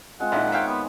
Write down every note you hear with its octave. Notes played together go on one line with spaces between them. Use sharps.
G#3 C4 F4 F#5
A#1 D#3 E4 A#5 C6
C4 C#5 E5 F5 G5 G#5
B3